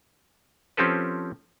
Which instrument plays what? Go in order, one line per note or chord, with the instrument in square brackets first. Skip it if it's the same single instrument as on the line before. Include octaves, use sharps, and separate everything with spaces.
[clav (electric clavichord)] F3 C4 C#4 G4 A4 B4